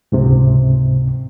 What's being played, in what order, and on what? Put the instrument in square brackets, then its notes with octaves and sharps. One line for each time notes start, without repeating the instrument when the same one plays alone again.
[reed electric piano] C#2 G#2 C3